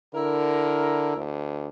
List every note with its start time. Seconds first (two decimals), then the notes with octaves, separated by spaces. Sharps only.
0.15 D3 E4 A#4
1.17 D2